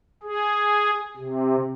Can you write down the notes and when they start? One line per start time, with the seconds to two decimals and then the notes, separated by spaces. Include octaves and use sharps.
0.23 G#4
1.17 C3